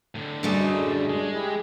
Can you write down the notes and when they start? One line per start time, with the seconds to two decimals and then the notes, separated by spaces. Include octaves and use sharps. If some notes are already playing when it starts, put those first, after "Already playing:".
0.15 A2 D3
0.43 F#2 G3 A3 D4 G#4 D#5
1.10 G#3
1.33 E4 G4 G#4